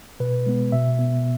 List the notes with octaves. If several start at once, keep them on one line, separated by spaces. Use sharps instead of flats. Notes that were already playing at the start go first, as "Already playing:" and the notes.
B2 B4
G#3 B3
B2 E5
B3